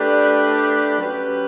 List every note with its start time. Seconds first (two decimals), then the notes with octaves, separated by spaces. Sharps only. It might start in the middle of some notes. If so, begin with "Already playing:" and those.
Already playing: A3 D4 G4 B4 D5
0.98 F#3 C#4 G4 B4